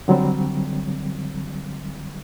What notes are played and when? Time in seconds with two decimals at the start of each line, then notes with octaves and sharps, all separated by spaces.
0.08 D3 F#3 G3 C4